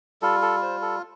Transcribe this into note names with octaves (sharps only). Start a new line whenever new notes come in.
G3 F4 A4
A4
C5
A4